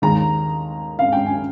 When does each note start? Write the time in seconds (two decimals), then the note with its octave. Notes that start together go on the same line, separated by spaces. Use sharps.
0.02 D#2 D#3 G#3 A#5
0.99 F5
1.12 G5
1.26 G#5